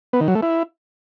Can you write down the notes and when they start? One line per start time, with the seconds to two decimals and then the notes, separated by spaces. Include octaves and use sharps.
0.13 B3
0.21 D#3
0.28 F#3
0.35 A3
0.43 E4